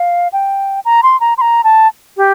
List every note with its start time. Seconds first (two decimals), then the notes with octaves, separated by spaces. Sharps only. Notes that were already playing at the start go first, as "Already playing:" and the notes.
Already playing: F5
0.33 G5
0.85 A#5
1.03 C6
1.20 A#5
1.38 C6
1.41 A#5
1.64 A5
2.17 G4